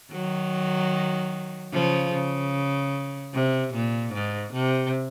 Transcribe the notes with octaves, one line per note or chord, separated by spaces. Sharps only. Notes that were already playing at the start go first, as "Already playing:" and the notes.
D#3 F#3
C#3 F3
C#3
C3
A#2
G#2
C3